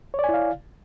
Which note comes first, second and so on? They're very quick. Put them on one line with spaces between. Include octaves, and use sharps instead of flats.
C#5 D5 G#5 E4 F5